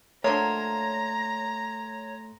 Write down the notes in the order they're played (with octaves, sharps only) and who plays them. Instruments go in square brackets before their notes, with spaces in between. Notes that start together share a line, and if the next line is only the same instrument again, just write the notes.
[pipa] D3 F3 A#3 [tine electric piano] A3 C6 [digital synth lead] C#5 [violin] A#5